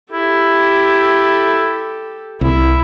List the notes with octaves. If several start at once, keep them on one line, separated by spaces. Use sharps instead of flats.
E4 G4 A4
C2 E4